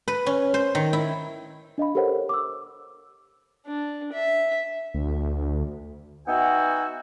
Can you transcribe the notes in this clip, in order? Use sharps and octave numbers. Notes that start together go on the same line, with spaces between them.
B4
C#4
C5
D#3
E4
D4 D#5 F5 B5
G4 A4 A#4 C5 C#5 F#5
D6 E6
D4
E5
D2
B3 D#4 F#4 E5 G5 G#5